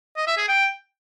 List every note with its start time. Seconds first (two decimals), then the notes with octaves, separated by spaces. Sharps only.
0.17 D#5
0.27 E5
0.38 G#4
0.48 G5